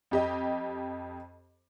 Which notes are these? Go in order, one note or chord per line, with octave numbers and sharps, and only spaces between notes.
F2 G4 D#5